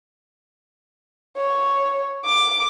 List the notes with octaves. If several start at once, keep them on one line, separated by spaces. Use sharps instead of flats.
C#5
D6